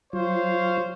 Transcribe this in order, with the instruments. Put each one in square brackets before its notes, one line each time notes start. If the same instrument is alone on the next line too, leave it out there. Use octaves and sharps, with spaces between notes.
[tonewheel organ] F#3 F4 [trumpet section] C5 C#5 F5